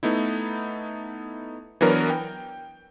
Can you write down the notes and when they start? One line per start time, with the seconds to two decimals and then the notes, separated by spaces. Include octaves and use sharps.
0.03 A3 B3 D#4 E4
1.81 E3 F#3 B3 D4 A#4 C#5
2.10 G5